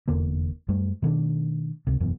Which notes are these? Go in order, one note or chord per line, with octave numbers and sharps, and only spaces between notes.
F1 E2 D3 A#3
F#2 G3 A3
B2 D#3 A3 D4
C#2 C3
E1 F#2 B2 E3